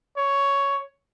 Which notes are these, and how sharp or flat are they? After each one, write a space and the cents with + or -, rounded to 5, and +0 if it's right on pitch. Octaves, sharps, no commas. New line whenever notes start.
C#5 +10